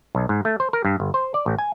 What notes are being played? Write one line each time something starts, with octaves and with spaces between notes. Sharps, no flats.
B1
G#2
A3
C5
A#4
G2
G1
C5
D5
A1
G#5